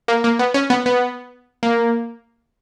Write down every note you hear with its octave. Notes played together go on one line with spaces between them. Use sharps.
A#3
A#3
B3
C#4
B3
B3
A#3